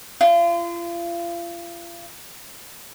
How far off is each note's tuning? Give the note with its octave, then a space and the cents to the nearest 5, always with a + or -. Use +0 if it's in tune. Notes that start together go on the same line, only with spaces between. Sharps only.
F4 -35